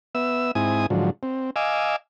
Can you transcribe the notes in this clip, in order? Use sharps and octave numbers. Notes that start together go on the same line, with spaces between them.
B3 E5 E6
G#2 C4 E4 G#5 D#6
G#2 D3 F3 F#3
C4
D#5 F5 G#5 D6 E6